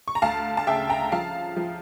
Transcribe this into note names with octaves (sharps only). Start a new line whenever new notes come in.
C#6
A#5
D2 F5 A5
A5
C#3 E5 G5
G5 A#5
F3 F5 A5
F3